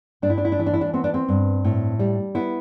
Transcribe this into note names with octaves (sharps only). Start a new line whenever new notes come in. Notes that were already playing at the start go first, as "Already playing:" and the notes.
G2 D4
E4
D4
E4
D4
E3 E4
D4
E4
D4
B3 C4
D4
C4
G2
A2
G3
B3 E4